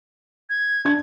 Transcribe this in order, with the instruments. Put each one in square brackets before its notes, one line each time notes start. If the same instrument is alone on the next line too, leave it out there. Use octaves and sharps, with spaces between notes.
[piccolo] G#6
[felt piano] D4 G#6